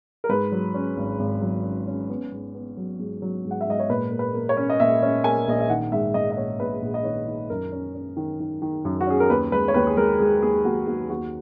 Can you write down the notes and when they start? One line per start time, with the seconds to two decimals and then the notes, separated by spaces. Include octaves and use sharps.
0.24 A#4
0.29 G#2 B4
0.52 F#3
0.74 C#4
0.97 G#1
1.19 G#1
1.42 F#3
1.64 C#4
1.87 C#4
2.09 B3
2.32 G#2
2.55 B3
2.77 F#3
2.99 G#2
3.22 F#3
3.45 G#2
3.51 F#5
3.61 E5
3.67 G#2 D#5
3.79 C#5
3.89 A#2 B4
4.12 A#3
4.19 B4
4.34 A#3
4.49 C#5
4.57 C#4
4.70 D#5
4.80 A#2 E5
5.02 C#4
5.24 A#3 G#5
5.47 A#1 D#5
5.60 E5
5.70 D#3 F#5
5.92 G#2 E5
6.14 G#2 D#5
6.31 D#5
6.37 A#1 C#5
6.60 A#1 B4
6.82 A#1
6.94 D#5
7.04 D#3 C#5
7.27 D#3
7.50 F#2 A#4
7.72 C#4
7.95 C#4
8.17 D#3
8.40 D#3
8.62 D#3
8.85 F#2
9.01 F#4
9.07 C#4 G#4
9.20 A#4
9.30 D#2 B4
9.52 G#3 B4
9.68 C#5
9.74 D#2 B4
9.87 G#4
9.97 G#3 A#4
10.20 G#3 G#4
10.42 D#2 G#4
10.65 D#2 F#4
10.87 D#2 F#4
11.10 D#2 F#4